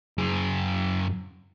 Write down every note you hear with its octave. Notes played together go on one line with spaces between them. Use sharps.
F#2 G#4